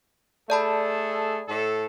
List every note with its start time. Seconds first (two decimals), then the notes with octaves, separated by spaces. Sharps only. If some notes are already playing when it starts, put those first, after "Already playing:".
0.50 A3 G#4 A4 D5 A5 B5
1.48 A2 A4